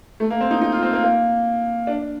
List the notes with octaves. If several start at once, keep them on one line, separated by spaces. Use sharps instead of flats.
A3
A#3
C4
D#4
D#4
F4
C4
A#3
A#3
D4